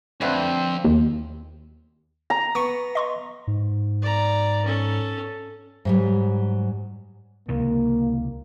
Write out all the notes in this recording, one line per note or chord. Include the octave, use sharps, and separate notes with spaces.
F2 D3 A3 C4 B4
D#2
A#5
B3 C#6 C#7
D#5 C6 C#6
G#2
D5 A#5
C#4 A4
G#2 F#3 G3
C#2 C3 D#3 A#3